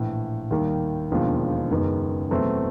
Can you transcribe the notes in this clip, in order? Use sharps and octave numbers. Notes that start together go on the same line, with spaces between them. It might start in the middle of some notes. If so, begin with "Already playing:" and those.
Already playing: A#1 A2 E3
D#2 D#3 G3
E1 D#2 D3 F3 G#3
F#1 F#2 D#3 G#3 B3
E2 B2 F#3 A3 C4